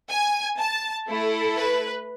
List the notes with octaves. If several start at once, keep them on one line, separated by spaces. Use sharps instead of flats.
G#5
A5
A3 E4 A4
B4